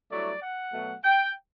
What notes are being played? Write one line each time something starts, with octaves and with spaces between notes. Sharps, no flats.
G2 F#3 A3 E4 D5
F#5
B2 F#3 A3
G5